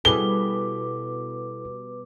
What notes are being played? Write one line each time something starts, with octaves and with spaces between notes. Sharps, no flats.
B2 G3 E4 G#4 A4 B4 D6 G7